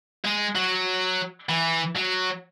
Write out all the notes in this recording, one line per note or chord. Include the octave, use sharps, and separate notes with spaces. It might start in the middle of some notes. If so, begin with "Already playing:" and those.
G#3
F#3
E3
F#3